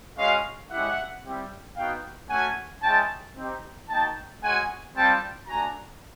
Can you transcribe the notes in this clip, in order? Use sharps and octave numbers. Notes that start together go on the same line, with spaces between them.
G#3 C#4 F#4 D#5 F5
G#3 C#4 E4 G4 E5 F#5
G3 C4 E4 G4
B3 D#4 F#4 F5 G5
A3 C#4 F#4 F#5 G#5
G#3 C#4 E4 G5 A5
C4 D#4 G4
A#3 D#4 F#4 G5 A5
G#3 C#4 F#4 F#5 G#5
G3 C4 F4 G5 A5
A3 D4 F#4 G#5 A#5